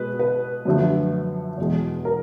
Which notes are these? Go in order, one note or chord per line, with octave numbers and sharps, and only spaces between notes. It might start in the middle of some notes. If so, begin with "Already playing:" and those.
Already playing: B2 G#3 B4
B4
F#2 D3 F3 A3
E2 B2 G#3
A#4